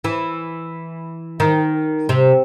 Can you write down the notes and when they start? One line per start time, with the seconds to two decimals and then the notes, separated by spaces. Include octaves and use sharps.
0.04 E3
1.40 D#3
2.09 C3